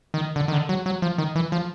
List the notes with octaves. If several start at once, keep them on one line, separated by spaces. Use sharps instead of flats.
D#3
D3
D#3
D3
F#3
F#3
F3
D#3
E3
F3